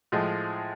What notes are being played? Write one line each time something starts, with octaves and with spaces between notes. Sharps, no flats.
A2 F3 G#3